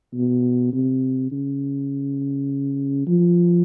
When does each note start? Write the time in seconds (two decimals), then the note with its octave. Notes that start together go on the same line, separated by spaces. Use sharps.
0.14 B2
0.73 C3
1.31 C#3
3.07 F3